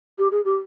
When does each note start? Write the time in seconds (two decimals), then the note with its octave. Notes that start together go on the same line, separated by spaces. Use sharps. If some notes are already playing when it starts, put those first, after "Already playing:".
0.19 G4
0.32 G#4
0.45 G4